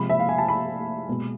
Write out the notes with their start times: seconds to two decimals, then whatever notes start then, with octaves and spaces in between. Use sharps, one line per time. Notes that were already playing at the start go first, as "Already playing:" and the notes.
Already playing: C3 F3 G#3 B5
0.09 E5
0.20 F5
0.29 G#5
0.38 A5
0.48 B5
1.08 B2 G#3